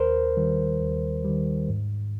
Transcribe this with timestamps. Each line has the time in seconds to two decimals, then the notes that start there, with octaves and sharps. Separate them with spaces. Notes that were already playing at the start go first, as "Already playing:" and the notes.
Already playing: D#2 A#4 C5
0.37 D#3 G3
0.81 D#2
1.25 D#3 G3
1.69 G#2